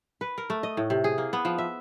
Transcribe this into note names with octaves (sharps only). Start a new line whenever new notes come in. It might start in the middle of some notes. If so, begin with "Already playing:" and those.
B4
A#4
A3
D#5
A2
C3
G#4
A#3
B3
F3
E5